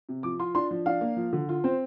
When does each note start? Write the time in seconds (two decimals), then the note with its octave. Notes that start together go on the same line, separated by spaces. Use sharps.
0.09 C3
0.23 F3 D6
0.39 F4 C6
0.55 D4 C6
0.71 F3
0.86 D4 F5
1.01 A#3
1.17 F3
1.33 D3
1.49 F4
1.64 C4 C5